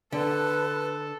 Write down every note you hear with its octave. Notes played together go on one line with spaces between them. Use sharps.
D3 A4 B4